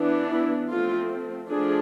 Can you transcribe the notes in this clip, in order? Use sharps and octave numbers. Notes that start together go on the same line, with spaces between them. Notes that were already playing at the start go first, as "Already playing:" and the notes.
Already playing: E3 B3 D4
E4
F3 A3 C4 F4
F3 A3 D4 G#4